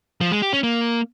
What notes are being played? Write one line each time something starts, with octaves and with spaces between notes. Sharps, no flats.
F3
G#3
G4
C#4
A#3